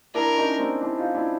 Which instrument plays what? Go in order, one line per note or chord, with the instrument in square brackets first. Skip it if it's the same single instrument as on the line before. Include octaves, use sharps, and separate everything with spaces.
[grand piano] D4 E4 [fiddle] A#4
[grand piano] C#4 D#4
C4 D4
D4 E4
D#4 F4
D4 E4